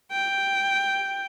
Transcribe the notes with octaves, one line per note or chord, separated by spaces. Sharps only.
G5